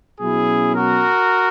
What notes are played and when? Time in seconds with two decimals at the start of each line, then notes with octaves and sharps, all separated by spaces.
0.20 B2 F#3 C#4 E4 G#4
0.75 F#4 A#4